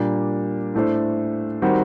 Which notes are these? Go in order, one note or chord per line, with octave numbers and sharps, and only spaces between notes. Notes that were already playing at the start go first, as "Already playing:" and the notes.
Already playing: A#2 G3 A#3 D4
A2 A3 D4 A4 C5
D#3 G3 C4 F#4 A#4